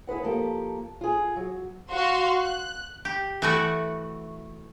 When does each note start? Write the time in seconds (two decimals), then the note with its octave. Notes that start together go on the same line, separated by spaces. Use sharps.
0.07 E4 G#4 B4 F#5
0.23 F3 A#3 G4 A4
1.01 F4 G#4
1.36 F#3
1.92 F#4 F5 C6
2.38 F#6
3.05 G4
3.42 E3 A3 F#4